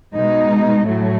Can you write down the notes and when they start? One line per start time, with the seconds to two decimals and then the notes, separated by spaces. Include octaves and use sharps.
0.14 B2 G#3 D#4
0.86 A2 F#3 A3